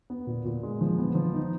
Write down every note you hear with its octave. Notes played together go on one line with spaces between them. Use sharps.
B3
A#2
A#2
G#3
F3
B3
F3
D#4